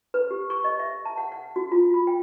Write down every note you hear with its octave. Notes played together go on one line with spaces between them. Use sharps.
B4
G4
C#6
D#5
E5
A5
F#5
F#5
F#4
F4
B5
G5